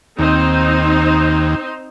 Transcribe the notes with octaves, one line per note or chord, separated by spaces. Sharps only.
D#2 C4 D#4 C5